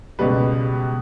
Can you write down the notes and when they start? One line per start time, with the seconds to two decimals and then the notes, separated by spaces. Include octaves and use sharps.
0.19 C#2 B2 G3 B4